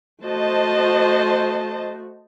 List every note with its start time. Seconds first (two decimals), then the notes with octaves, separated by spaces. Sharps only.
0.23 A3 F#4 C5 D#5 A5